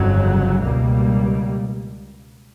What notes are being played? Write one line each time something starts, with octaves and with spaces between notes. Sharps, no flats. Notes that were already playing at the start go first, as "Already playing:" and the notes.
Already playing: G1 F2 C#3 F#3
C#2 B2 G3 A#3